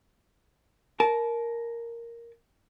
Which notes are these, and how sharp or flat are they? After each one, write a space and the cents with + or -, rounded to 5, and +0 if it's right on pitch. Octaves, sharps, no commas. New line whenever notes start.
A#4 +0 A5 -30